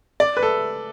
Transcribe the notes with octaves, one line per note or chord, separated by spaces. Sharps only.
D5
B4
A4